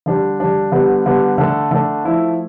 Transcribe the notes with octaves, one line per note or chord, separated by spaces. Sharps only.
D3 G3 D4
D3 G3 D4
D3 G3 B3
D3 G3 B3
D3 A3 D4 A4
D3 A3 D4 A4
F3 A3 E4